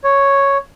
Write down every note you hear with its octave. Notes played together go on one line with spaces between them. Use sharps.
C#5